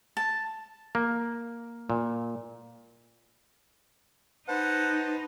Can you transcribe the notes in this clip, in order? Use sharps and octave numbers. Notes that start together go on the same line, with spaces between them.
A5
A#3
A#2
D#4 B4 C5 F#5 A5